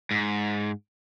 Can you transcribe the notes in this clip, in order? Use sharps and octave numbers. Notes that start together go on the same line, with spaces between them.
G#2